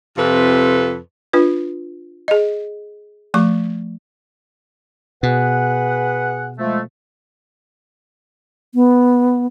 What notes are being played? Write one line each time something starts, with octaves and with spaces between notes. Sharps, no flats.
F2 C3 F4 A4 B4
D4 F4 B4
G#4 D#5
F3 A3 C#6
B2 G#4 B4 F#5
F3 G#3 A3
B3